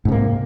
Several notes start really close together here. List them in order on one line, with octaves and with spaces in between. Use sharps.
G#2 C3 A#3